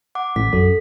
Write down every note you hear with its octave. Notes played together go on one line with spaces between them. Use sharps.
F#5 D6
A1 B6
F#2 A4